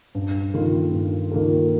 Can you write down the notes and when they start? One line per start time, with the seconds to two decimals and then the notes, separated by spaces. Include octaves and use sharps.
0.15 G2
0.54 D#3 A#3 F4 A4
0.92 G2
1.32 D#3 A#3 F4 A4